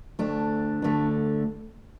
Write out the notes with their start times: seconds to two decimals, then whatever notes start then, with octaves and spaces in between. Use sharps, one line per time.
0.19 D2 D3 A3 D4
0.82 D2 D3 A3